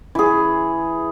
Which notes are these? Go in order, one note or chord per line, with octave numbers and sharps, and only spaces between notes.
E3 G#4